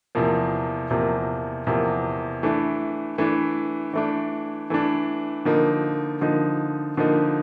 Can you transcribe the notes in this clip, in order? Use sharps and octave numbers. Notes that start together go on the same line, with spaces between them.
E2 C3 F3 A#3
E2 C3 F3 A#3
E2 C3 F3 A#3
E3 A3 D4
E3 A3 D4
E3 A3 D4
E3 A3 D4
D3 F3 A#3 D#4
D3 F3 A#3 D#4
D3 F3 A#3 D#4